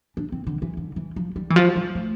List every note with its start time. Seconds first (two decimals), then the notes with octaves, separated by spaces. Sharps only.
0.17 D4
0.32 C4
0.47 D3
0.62 E3
0.77 D3
0.96 E3
1.16 F3
1.36 G3
1.50 E3
1.56 F3
1.76 G3
1.95 A3